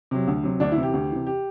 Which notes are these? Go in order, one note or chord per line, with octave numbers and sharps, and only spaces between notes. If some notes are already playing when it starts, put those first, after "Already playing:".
C3 F#3
D2
C3 F#3
D2 D4
E4
C3 E3
G4
D2
C3 E3
G4